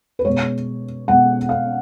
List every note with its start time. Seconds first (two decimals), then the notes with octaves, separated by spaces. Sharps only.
0.19 B4
0.25 B2 G#3 B3 C#5
1.08 B2 G#3 B3 F#5
1.49 F5